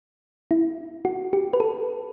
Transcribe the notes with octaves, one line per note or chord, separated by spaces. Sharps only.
E4
F#4
G4
B4
A4